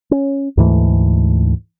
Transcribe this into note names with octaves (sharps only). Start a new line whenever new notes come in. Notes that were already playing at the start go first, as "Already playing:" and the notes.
C#4
D2 G#2 E3 A3